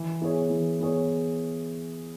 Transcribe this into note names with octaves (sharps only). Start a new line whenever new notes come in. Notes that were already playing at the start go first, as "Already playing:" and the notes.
Already playing: E3
B3 E4 G#4 C#5
E3
B3 E4 G#4 C#5